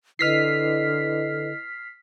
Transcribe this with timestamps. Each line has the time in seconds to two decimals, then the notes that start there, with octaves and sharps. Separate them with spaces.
0.19 D3 E4 B4 D#5 F6 B6 C7